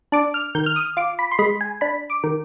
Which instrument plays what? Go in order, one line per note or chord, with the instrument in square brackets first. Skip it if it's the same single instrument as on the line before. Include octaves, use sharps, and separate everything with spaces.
[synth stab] D4 D6
F6
D#3 G6
F6
D#6
F4 D6
B5
C6
G#3 B5
G#5
D4 B5
D6
D#3